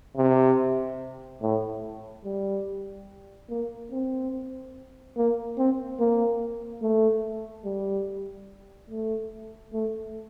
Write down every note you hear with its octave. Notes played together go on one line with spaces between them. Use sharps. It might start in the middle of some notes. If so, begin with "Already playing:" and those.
C3
A2
G3
A#3
C4
A#3
C4
A#3
A3
G3
A3
A3